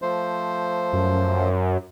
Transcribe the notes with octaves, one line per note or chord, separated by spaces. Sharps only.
F3 A3 C5
F#2